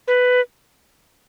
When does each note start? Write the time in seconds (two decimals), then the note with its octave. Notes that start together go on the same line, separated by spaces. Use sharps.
0.08 B4